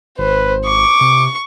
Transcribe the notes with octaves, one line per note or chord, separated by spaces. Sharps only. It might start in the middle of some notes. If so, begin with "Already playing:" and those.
G#1 B4 C5
C#6 D6
C3